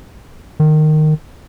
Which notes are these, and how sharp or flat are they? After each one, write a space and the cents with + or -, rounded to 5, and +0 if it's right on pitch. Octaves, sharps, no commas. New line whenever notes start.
D#3 -15